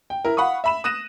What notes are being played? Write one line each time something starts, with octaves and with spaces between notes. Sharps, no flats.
G5
E4 A#4
F5 F#5 B5 C#6 D#6
E5 B5 E7
D#6 F#6 A#6 D#7 E7